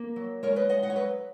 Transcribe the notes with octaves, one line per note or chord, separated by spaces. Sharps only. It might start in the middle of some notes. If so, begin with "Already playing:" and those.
Already playing: A#3
F#3
G#3 A#4 C#5
B4 D#5
G#3 D#5 F#5
D#5 F#5
C#5
F#3 B4 D#5